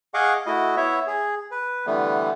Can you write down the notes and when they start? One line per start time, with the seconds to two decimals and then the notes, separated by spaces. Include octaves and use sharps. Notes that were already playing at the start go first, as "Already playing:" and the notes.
0.14 G#4 D#5 F5 F#5 C#6 D6
0.46 A3 E4 F#4 D#5
0.77 B3 E4 C#5 E5
1.07 G#4
1.51 B4
1.86 D3 E3 G3 A3 B3